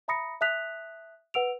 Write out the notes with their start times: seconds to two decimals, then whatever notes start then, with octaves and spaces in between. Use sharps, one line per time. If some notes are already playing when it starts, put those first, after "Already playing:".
0.08 E5 A#5 B5 D#6 A#6 C#7
0.41 E5 A5 D#6 F#6 B6 F7
1.34 B4 F#5 E6 D7 F7